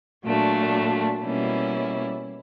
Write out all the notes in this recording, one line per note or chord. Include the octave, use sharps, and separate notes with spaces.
A#2 F#3 A3 D4
B2 G3 A#3 C#4 E4